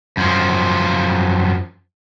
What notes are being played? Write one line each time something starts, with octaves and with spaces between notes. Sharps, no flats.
F#2 F3